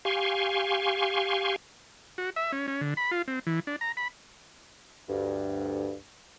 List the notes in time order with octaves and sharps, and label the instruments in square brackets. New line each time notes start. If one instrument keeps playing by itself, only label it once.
[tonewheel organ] G4 F5 G#5 C6 C#6
[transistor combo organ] F#4
E5
C#4
C#4
D3
B5
F4
C4
E3
D4
A#5
B5
[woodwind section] D2 G2